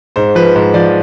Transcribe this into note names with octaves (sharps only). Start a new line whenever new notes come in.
G#2 C5
F3 B4
G#2 C5
F3 D5